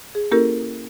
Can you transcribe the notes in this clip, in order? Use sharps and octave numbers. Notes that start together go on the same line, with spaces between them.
G#4
A#3 C#4 E4 G4 A4 A#4